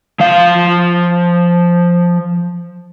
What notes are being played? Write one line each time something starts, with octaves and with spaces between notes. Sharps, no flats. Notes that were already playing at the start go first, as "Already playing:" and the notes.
F3 F5